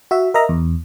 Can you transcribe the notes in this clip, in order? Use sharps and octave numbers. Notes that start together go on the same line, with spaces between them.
F#4 E5
A#4 D#5 E5 A#5
E2